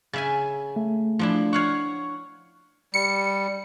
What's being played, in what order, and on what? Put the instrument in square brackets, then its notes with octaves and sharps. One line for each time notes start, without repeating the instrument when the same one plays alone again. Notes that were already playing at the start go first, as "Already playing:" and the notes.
[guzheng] C#3 E5 G#5
[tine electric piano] A3
[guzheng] F3 D4 E4
[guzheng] C#5 F5 F#5 [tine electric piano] C#6
[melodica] G3 [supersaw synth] C#7